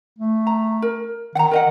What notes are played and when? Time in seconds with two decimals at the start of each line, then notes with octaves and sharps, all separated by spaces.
0.19 A3
0.47 A#5
0.82 A#4
1.35 D#3 F#5 A#5
1.51 A#4 D#5 F#5